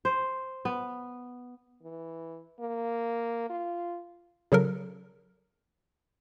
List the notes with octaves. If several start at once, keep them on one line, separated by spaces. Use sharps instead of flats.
C5
B3
E3
A#3
F4
C#3 F#3 A4 A#4